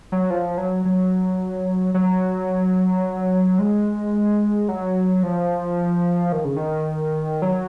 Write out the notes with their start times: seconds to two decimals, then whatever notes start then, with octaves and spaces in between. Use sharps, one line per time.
0.12 F#3
0.30 F3
0.58 F#3
0.85 F#3
1.94 F#3
3.59 G#3
4.68 F#3
5.23 F3
6.32 D#3
6.45 C#3
6.56 D#3
7.42 F#3